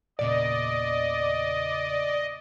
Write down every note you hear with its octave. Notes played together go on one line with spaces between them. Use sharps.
E2 A#2 C#3 D5 D#5